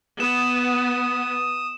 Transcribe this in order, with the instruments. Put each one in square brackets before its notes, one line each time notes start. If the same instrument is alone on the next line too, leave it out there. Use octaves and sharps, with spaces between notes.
[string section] B3 [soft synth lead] D#6 [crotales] E7